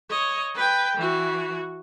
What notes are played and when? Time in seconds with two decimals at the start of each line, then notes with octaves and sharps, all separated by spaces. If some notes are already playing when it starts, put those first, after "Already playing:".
0.10 C#5 D#5
0.55 B4 G5
0.97 E3 F#4